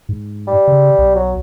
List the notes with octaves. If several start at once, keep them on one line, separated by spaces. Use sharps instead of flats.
G#2
G3
C#3
B1
F#3